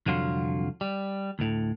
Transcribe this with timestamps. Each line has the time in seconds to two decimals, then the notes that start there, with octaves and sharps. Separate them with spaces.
0.06 C2 F2 D3 F#3 F4
0.81 G3
1.39 D2 A2